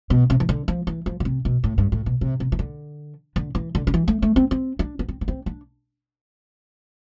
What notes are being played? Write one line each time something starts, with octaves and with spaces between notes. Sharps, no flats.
B2
C3
E3
D3
F3
E3
F3
D3
C3
B2
A2
G2
A2
B2
C3
C3
E3
D3
D3
E3
D3
D3
E3
A3
A3
C4
C4
D4
B3
C4
B3
C4
D4